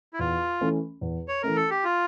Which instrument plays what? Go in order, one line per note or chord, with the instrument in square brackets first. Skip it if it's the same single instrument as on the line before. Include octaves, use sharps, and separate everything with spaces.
[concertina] E4
[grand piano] E2 [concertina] F4
[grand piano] E3 A3 C#4
E2
[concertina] C#5
[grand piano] E3 A3 C#4 [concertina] A#4
[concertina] A4
G4
F4